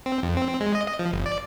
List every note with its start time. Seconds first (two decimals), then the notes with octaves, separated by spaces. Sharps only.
0.06 C4
0.23 F2
0.36 C4
0.48 C4
0.60 G#3
0.75 D#5
0.88 D#5
0.99 F3
1.13 G1
1.26 D5